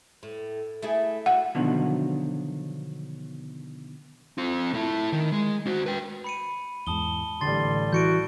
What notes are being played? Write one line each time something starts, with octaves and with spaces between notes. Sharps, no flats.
A2
A3 E4 G#4
F#4 F#5
B2 D3 D#3 F3 F#3
C4 F4
A3 E4
D#3
G#3
F#4 C5
B4 G5
B5 C#7 D#7
E2 G#2 A5 D#6 G7
A1 D3 G3 C6 A6
E3 F#4 G6 C#7 D7